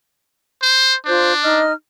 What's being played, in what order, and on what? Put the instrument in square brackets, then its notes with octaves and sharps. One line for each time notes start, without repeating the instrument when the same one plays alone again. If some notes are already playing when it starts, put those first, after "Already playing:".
[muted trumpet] C5
[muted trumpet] D4 [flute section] F4 C5 G6
[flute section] D#4 D#5 F6